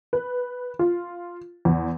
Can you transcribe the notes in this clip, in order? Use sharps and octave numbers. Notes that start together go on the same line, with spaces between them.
B4
F4
E2